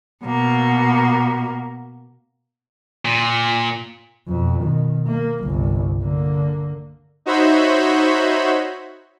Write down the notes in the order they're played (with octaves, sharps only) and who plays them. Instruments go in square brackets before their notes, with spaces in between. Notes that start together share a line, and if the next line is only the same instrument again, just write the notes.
[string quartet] B2 A#3
[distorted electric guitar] A#2
[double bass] F2 B2
B2 D#3
A#3
G1 C2
D3 A#3
[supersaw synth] D#4 F#4 C5 C#5 E5 B5